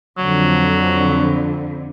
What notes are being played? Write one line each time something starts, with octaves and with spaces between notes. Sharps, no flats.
F2 D3 F#3